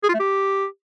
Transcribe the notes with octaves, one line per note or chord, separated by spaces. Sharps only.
G#4
F4
A3
G4